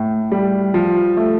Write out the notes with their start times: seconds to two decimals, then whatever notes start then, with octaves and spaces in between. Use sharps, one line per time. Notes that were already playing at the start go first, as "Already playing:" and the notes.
Already playing: A2
0.32 G3
0.74 F3
1.17 A3